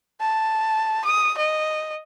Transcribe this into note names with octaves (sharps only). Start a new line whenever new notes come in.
A5
D#6
D#5